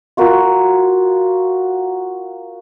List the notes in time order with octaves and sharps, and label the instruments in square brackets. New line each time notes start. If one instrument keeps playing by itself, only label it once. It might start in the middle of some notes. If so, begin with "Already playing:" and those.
[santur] F4 F#4 A#4